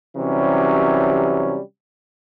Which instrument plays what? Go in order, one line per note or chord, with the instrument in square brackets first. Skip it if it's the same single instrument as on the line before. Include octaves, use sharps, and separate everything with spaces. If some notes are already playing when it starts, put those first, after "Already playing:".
[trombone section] C3 E3 F#3 G3 C#4